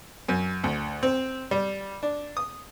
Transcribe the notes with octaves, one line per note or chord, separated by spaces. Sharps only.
F#2
D2
C4
G3
D4
D#6